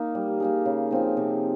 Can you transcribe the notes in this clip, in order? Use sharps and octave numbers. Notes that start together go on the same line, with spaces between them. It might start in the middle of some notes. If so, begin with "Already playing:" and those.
Already playing: A#3 D#4
G3
A#3 D#4 G#4
C#3
F3 C4 D#4
C3